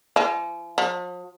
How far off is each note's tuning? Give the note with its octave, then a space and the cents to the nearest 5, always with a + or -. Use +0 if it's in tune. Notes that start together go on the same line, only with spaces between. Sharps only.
F3 -40
F3 +40